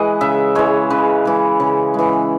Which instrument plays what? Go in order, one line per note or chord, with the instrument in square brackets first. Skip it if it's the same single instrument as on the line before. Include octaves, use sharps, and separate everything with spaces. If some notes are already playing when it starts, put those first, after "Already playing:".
Already playing: [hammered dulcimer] E3 G#3 B4 D#5
C#3 E5
E3 G#3 C#5
C#3 B4
E3 G#3
C#3
E3 G#3